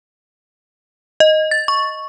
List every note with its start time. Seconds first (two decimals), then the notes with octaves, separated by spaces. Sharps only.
1.20 D#5
1.51 A6
1.68 C#6